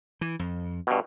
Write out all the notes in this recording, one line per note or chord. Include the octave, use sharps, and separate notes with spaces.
E3
F2
G2 B2